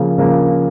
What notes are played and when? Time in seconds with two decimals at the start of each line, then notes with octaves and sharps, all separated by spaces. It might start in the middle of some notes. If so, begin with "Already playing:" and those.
Already playing: C#3 F3 A#3
0.18 C#3 F3 A#3